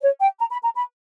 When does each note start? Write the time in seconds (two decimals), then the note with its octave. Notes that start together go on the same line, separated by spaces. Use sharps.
0.03 C#5
0.21 G5
0.39 A#5
0.51 B5
0.64 A#5
0.76 B5